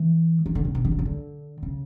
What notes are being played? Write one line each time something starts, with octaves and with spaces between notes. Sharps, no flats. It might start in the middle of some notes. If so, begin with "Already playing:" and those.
Already playing: E3
D#3
D3
C#3
C3
D#3
D3
C#3
D3
C#3